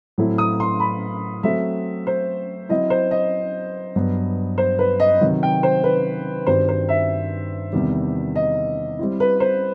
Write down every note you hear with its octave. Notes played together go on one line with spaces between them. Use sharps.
A2 F#3 C4 E4 A4
D#6
C6
B5
F#3 A3 C4 F#4 A4 E5
C5
F#3 C4 E4 D#5
C5
D#5
G2 F#3 B3
C5
B4
D#5
C3 D#3 F#3
G5
C5
B4
G2 D#3 G3 C4 F#4 C5
C5
E5
E2 C3 D#3 G3
D#5
G3 C4 E4
B4
C5